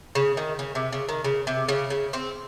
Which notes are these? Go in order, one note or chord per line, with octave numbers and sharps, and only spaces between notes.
C#3
D#3
C#3
C3
C#3
D#3
C#3
C3
C#3
C#3
C4